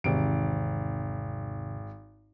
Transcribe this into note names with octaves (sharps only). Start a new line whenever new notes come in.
G#1 E2 C3 D#3 D7